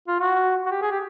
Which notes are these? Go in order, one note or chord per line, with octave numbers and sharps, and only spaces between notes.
F4
F#4
F#4
G4
G#4
G4